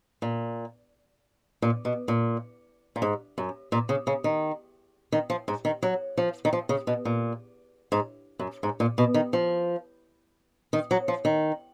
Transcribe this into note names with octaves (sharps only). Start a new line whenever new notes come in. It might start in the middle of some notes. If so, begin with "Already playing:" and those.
A#2
A#2
B2
A#2
A#2
G#2
F#2
A#2
C#3
C#3
D#3
D#3
F3
G#2
D#3
F#3
F3
D#3
F3
C#3
B2
A#2
G#2
F#2
G#2
A#2
B2
D#3
F3
D#3
F#3
F3
D#3